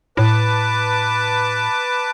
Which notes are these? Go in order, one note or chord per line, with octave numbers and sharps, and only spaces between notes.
A2 B4 A5 D6